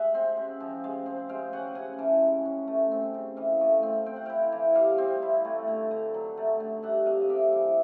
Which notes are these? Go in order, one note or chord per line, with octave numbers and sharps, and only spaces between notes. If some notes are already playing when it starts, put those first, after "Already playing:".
Already playing: G#3 E5 F#5
C4
C#3
F3
G#3
C4
G#3 F5 G5
C#4 F#5 G#5
C#3 F#5 G#5
E3 G5 A5
G#3
C#4
A3
C4
C#3
E3 D#5 F5
A3
C4
C4 G5
F#5
E4 F5 G5
E3
G3 D#5 F5
C4
E4
A3
D3
D3
F#3
A3
D3
G3 E5 F#5
C3 D#5 F5
D#5
C3 D5 E5
E3